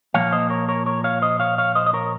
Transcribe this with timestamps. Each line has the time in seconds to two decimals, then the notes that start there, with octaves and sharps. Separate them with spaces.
0.14 A#2 F3 A#3 C#5 F5
0.32 C5 D#5
0.50 A#4 C#5
0.69 A#4 C#5
0.86 A#4 C#5
1.04 C#5 F5
1.22 C5 D#5
1.40 C#5 F5
1.58 C#5 F5
1.75 C5 D#5
1.86 D#5
1.94 A#4 C#5